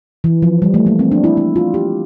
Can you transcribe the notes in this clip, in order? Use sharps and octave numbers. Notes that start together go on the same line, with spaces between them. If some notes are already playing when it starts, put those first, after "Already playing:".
E3
F3
G3
A3
A#3
C4
D4
E4
E4
F4
G4